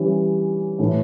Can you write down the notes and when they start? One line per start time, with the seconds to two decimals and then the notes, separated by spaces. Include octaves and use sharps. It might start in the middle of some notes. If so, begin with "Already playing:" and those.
Already playing: E3 G3 C#4
0.79 A2 E3 A3